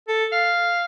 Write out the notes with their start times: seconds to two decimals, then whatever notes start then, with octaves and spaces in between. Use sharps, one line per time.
0.08 A4
0.32 F5